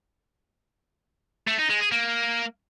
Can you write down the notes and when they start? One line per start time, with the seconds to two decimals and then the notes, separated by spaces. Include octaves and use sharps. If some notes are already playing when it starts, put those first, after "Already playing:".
1.48 A3
1.59 D#4
1.70 G#3
1.81 G#4
1.92 A#3